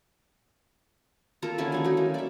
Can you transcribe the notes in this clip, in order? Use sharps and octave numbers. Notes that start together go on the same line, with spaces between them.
A#3 F4 A4 A#5
D3 F3 C#4 E4
D#3 G#3 A3
F#3 D#4
A#3
D5 E5